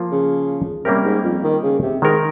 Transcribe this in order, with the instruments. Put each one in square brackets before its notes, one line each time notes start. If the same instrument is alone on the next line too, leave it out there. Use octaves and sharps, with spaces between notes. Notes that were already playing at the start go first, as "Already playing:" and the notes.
Already playing: [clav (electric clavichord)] F3 A#3 F4
[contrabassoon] C#3
[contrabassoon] C3 [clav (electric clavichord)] G3 A#3 C#4 G4 A#4
[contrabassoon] G#2
F2
D#3
C#3
C3
[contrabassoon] G#2 [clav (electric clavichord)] D#3 G#3 D#4 A#4